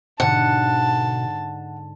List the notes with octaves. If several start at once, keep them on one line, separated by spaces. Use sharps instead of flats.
G#2 B2 D3 F#5 A5